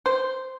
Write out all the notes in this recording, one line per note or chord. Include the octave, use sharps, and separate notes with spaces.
C5